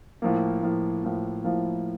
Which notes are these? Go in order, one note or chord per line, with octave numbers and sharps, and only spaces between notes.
A2 F3 A#3
A2 F3 A#3
A2 F3 A#3
A2 F3 A#3